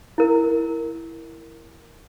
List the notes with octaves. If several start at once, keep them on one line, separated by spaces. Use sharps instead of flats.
E4 A#4